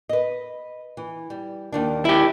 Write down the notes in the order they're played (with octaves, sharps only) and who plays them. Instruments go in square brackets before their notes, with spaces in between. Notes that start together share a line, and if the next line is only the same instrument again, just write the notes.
[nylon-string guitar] B4 D#5
E3
G3
D#2 D#3 D4
[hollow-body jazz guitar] E4 G4